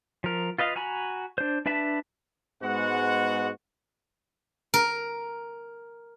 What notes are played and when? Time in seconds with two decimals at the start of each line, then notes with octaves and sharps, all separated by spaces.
0.24 F3 A#4
0.58 F4 B4 D#5 F5
0.76 F#4 G#5 A#5 B5
1.38 D4 C5
1.66 D4 B4 E5 A5 B5
2.61 G#2 G#3 B3 F#4 F#5
4.74 A#4